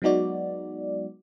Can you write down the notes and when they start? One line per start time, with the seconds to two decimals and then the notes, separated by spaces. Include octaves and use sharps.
0.02 F#3 G#3 B3 D#4 F#4 D5